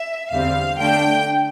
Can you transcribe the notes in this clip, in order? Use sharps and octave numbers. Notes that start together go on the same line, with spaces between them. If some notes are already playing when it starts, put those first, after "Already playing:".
Already playing: E5
E2 D3 G3 C4 F5
D3 A3 D4 G5